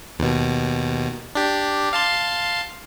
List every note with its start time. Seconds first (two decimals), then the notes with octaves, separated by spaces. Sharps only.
0.19 D#2 B2
1.35 D4 G4
1.93 F5 A5 C6